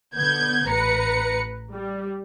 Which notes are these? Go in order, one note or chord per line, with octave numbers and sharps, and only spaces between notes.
D3 B3 G6 G#6
A1 B4 A#5 C#7
G3